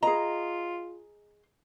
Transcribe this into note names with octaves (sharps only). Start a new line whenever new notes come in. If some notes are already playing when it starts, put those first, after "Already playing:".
F4 G#4 D#5 A#5